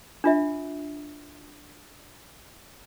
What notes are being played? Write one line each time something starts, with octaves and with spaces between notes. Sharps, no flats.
D4 F4 E5